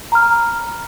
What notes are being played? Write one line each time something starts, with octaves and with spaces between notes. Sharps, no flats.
A#5 B5 F6